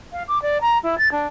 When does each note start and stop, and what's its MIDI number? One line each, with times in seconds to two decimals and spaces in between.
0.12 0.22 77
0.27 0.41 86
0.42 0.57 74
0.61 0.77 82
0.83 0.97 64
0.98 1.08 93
1.11 1.26 62